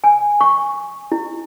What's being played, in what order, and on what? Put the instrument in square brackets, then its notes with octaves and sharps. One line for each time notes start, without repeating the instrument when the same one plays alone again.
[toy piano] G#5
C#6
E4